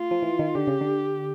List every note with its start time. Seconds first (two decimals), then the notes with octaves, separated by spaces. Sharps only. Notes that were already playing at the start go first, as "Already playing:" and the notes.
Already playing: A3 F4
0.11 F3
0.22 E3
0.39 D#3
0.55 D3 G4
0.67 C#3
0.81 D3